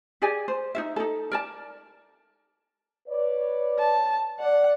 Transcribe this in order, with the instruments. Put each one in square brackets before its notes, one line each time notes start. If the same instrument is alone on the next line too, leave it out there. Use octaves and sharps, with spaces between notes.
[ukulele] G4 G#4 D5 G#5
C5
D#4 F4 E5
D#4 A4
A#4 D5 A5
[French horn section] B4 C#5 D5
[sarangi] A5
[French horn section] D5 [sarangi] F#5